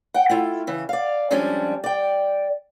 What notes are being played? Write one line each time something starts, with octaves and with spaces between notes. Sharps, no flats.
F#5 G5
A3 E4 F4
C#3 E3
D5 F5
F2 F3 G3 G#3 C#4 D4
D5 G5